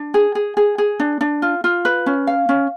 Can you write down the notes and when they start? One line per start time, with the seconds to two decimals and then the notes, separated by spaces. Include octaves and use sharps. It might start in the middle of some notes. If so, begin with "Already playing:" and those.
Already playing: D4
0.14 G#4
0.35 G#4
0.57 G#4
0.78 G#4
1.00 D4
1.21 D4
1.42 F4
1.64 F4
1.85 B4
2.06 C#4
2.27 F5
2.49 C#4